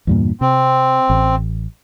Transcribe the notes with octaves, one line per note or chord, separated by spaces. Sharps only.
E2 G2 A#2
C3 C4
A1